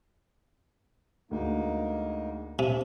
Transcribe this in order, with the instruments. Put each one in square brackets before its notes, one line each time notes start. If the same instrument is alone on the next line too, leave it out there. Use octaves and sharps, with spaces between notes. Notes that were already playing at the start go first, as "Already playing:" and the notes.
[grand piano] D2 [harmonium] G#3 A#3 D#4
[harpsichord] C3 [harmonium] D4